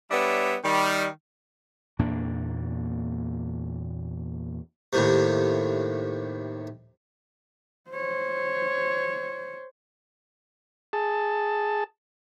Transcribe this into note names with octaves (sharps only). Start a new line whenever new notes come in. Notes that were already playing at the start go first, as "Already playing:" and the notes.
G3 B3 D4 C#5 E5
D#3 G3
E2 A#2 A#3 D4
D#2 A2 C3
C5 C#5
G#4 A5